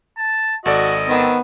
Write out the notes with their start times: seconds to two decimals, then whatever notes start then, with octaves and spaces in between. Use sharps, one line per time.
0.18 A5
0.65 G#1 F#4 A4 D5 D#5
1.09 D#3 B3 C4